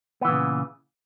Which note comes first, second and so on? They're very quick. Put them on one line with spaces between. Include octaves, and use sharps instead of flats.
B3 E3 A#2 C#3